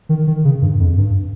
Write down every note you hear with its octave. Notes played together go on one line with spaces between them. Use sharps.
D#3
D#3
C#3
G2
F2
G2